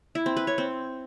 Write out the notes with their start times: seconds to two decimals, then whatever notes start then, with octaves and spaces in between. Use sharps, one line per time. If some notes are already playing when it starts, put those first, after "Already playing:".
0.15 E4
0.26 C4
0.37 B4
0.47 C#5
0.58 C4